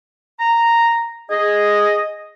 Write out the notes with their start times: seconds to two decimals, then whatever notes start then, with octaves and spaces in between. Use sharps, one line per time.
0.40 A#5
1.31 G#4 D#5